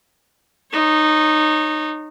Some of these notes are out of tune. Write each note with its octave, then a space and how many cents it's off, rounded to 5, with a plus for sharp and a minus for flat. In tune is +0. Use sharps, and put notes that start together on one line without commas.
D#4 -15 C#5 -25